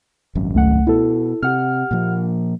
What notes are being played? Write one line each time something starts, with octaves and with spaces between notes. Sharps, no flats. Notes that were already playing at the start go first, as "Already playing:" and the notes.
D#1 G#1 F#2
C#2 A3 F#5
B2 E4 A4
C3 G4 F#5 F6
A#2 F3 A#3